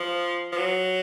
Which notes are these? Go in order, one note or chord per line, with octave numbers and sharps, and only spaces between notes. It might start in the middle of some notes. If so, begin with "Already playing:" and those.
Already playing: F3
F3
F#3